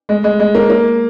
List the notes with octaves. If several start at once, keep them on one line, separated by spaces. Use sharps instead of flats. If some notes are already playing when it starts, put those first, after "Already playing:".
G#3
G#3
G#3
A#3
A#3